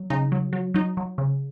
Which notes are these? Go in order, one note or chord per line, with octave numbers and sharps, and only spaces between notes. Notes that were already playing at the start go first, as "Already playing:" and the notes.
Already playing: F#3
C#3 D#4
F#3
F#3
F#3 D#4
F#3
C#3